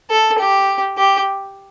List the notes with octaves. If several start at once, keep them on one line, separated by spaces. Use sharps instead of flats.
A4
G4
G4